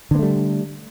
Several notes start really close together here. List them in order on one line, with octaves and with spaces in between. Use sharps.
D3 B3 A3 G3